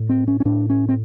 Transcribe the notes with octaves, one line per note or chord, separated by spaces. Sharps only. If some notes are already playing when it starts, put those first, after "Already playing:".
Already playing: A2
C4
C#4
C#4
A2 D4
C#4
C4